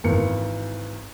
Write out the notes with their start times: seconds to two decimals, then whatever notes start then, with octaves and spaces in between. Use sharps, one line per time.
0.04 G#1 E3 A#4 C#7